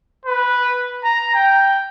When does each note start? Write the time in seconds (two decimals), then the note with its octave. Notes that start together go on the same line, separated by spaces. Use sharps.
0.25 B4
1.04 A#5
1.34 G5